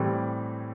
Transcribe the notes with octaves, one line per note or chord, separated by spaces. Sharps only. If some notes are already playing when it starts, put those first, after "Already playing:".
Already playing: A2 E3 G3 C4 G4